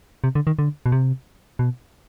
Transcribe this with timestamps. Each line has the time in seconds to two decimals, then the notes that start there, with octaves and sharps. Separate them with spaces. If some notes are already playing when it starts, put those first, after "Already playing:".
0.24 C3
0.35 D3
0.47 D#3
0.59 D3
0.86 B2
0.92 C3
1.59 B2